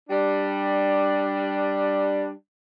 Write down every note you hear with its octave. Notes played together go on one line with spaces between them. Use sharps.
G3 D4